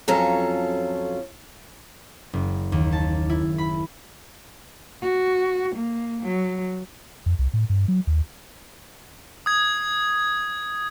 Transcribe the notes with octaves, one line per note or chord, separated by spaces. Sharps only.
F2 F#3 C#4 F4 A4 A#5
F#1
D#2
A5
E4
B5
F#4
A#3
F#3
F2
C2
A2
G2
F#3
D#2
D#6 G#6